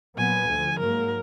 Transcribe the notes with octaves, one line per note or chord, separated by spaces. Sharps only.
A#2 F#3 B3 G#5
D2 D3 F3
G#2 F#3 A#3 A#4